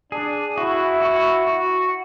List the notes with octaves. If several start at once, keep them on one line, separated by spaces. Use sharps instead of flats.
D4 G#4
E4 F#4
F#4
F#4